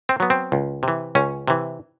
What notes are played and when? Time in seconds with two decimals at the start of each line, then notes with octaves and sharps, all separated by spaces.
0.09 C4
0.20 F#3 B3
0.30 C4
0.52 C#2
0.83 C3 E3
1.15 C#2 C#4
1.48 C3 E3